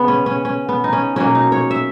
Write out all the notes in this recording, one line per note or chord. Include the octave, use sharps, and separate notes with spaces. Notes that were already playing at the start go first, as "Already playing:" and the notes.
Already playing: C#3 G#3 B3
C#4
C#4
C#4
B3
D#4
C#4
B2 F#3 A#3 C#4
D#4
C#5
E5